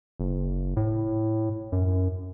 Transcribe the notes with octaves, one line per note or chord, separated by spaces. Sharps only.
F#1
A2
F#2